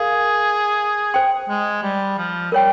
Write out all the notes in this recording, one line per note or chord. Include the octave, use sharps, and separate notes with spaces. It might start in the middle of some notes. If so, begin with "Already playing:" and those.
Already playing: G#4 A#4 F5
C5 G5 C6
G#3
G3
F3
G3 A#4 C#5 G5